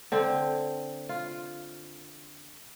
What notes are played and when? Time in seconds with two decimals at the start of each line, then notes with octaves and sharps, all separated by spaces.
0.12 D3 C4
1.09 F4